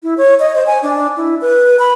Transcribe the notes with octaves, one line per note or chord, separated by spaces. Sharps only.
E4
C#5
D#5
C5
G#5
D4
E4
B4
B5